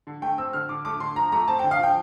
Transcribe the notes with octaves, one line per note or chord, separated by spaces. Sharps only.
D3
A3 G5
C4 E6
D3 F6
D3 D6
A3 D6
D3 C6
F3 A#5
A3 A#5
C4 A5
D3 G5
F5
F3 G5